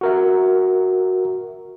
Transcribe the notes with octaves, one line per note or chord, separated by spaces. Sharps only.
F#4 A#4 E5